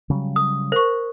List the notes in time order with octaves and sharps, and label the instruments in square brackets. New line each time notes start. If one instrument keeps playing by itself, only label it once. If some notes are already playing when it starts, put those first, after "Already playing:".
[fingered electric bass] C#3 F#3 G3
[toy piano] D#6
[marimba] A#4 C#6 [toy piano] C5